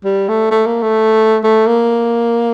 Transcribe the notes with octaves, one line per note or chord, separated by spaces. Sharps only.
G3
A3
A3
A#3
A3
A3
A#3